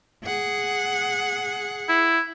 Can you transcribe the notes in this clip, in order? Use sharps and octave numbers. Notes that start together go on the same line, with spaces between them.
G#4 F#5
E4